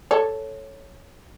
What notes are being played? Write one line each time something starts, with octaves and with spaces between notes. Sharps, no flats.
A4 C#5